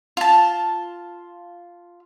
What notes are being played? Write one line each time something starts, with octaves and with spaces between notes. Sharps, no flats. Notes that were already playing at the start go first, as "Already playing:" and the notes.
F4 A5